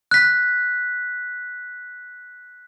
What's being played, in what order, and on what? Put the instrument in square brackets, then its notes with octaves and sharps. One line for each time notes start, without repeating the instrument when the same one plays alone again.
[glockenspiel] F#6 B6